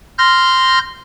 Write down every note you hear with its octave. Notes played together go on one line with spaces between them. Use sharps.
C6 F6 G6 A#6